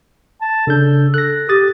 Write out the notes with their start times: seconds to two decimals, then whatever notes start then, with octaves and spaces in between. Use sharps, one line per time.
0.41 A5
0.67 C#3 D4 A4 G6
1.14 A4 F#6 A#6
1.49 G4 D#6 A6